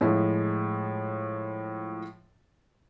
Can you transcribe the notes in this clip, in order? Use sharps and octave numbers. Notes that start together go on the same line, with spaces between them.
A2 F3 G#3 E4